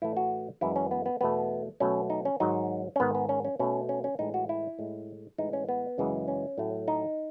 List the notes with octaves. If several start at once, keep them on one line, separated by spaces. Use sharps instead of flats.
A2 E3 A3 E4
F#4
F#2 E3 G#3 E4
C#4
B3
B3
E2 B2 A3 B3
B2 F#3 A3 C#4
D#4
C#4
G#2 D#3 F#3 D#4
C#4
G#2 D#3 G#3 B3
B3
C#4
C#4
B2 A3 C#4
C#4
C#4
A2 E3 G#3 D#4
F#4
E4
A2 G#3
A2 E3 G#3 D#4
C#4
B3
F#2 C#3 E3 G#3
C#4
A2 F#3 A3
D#4